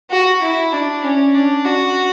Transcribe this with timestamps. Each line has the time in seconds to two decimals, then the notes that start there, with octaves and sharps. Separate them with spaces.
0.11 F#4
0.42 E4
0.73 D4
1.04 C#4
1.34 D4
1.65 F#4